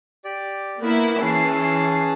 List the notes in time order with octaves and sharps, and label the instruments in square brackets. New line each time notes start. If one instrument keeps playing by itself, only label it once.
[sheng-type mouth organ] G4 D5
[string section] A#3 E4 [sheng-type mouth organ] B3
[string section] E3 C7 [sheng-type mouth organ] C#4 G#4 A5